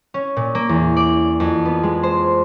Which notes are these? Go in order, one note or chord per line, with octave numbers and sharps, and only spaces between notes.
C#4
A#2
A#3
E2
D5
F2
B3
G#3
C5